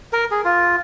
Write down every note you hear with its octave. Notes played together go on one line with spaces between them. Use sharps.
A#4
G#4
F4